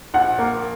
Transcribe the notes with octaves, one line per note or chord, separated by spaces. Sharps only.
A#1 F#5
A#3